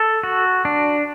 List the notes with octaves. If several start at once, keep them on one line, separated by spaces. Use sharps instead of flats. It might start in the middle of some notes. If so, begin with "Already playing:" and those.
Already playing: A4
F#4
D4